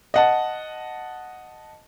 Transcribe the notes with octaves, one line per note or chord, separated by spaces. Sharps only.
D#5 F#5 A5